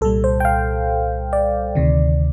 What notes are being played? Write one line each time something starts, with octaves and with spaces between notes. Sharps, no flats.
C2 A#2 G3 A4
C5
G5
F5
D5
D2 C3 D#3